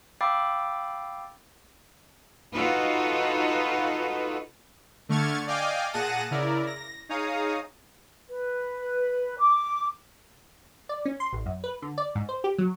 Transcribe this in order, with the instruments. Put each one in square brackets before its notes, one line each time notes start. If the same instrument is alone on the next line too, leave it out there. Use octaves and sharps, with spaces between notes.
[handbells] F5 G5 B5 D6 E6 A6
[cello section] D#4 F4 F#4 A4 B4
[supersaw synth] D3 A3 C#6 F6 G#6 A6
D5 D#5 F5 G5 G#5 D6
A#2 G#4 F#5 A5 A#6 D#7
C#3 E4 A#4 D5
A#6
D#4 G#4 C#5 F5 A#5 D#6
[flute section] B4
D6
[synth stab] D5
C#4
C6
A1
F#2
B4
D3
D5
G#2
C5
G4
F#3